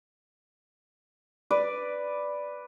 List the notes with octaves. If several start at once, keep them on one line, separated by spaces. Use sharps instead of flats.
B4 D5